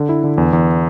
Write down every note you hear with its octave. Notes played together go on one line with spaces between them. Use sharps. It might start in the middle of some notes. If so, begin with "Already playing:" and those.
Already playing: D3
E4
D3
E2
E2